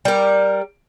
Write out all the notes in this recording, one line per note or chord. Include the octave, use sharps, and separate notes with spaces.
G3 A#4